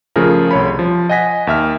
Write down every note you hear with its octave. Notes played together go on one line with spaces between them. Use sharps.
C#3 F3 A3 F4 G#4 A#4
C2 C#5 B5
F3
D#5 F#5 G#5 A#6 B6
D#2 E5 F6